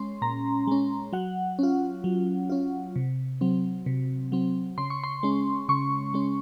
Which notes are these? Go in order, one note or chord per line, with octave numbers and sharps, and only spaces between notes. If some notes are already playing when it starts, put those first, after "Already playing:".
Already playing: G#3 C#4 C6
A#2 A#5
G#3 C#4
F#3 F#5
C#4 F4
F#3
C#4 F4
C3
F#3 C4
C3
F#3 C4
C#3 C6
C#6
C6
G#3 C#4
C#3 C#6
G#3 C#4